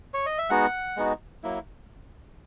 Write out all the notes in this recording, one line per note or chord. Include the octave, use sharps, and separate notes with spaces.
C#5
D#5
E5
G#3 B3 D#4 F#4 F#5
G#3 B3 D#4 F#4
F#3 A#3 E4